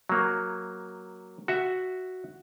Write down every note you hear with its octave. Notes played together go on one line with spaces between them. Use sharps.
F#3 A#3
F#4 E5